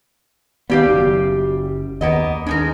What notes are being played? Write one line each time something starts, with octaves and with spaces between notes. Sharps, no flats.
D#2 D#3 G3 B3 G4 F5
F#1 F#2
D#2 A#3 B3 D#5
G#3 D4 D#4 A#4